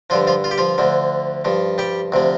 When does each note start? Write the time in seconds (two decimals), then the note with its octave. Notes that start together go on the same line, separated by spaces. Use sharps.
0.10 G2 D3 F3 F4
0.27 F3 F4
0.44 F4
0.51 G4
0.58 F3 F4
0.78 D2 D3 F3
1.45 G2 F3
1.78 G3 G4
2.12 D2 C3 F3